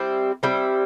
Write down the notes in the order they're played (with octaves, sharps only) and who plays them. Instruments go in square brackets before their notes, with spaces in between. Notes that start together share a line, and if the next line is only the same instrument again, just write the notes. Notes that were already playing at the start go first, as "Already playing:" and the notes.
Already playing: [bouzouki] G3 C4 E4
G3 C4 E4